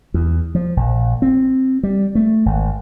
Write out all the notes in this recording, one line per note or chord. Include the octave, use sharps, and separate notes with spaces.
E2
F3
A#1
C4
G3
A3
G#1